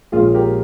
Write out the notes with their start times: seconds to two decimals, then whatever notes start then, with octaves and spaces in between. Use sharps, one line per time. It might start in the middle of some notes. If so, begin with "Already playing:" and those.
0.12 A#1 A#2 G#3 C#4 F4 G#4
0.34 G4 A#4